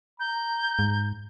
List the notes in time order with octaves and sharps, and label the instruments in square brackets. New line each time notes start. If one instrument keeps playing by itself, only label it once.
[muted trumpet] A#5 [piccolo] G6
[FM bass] G#2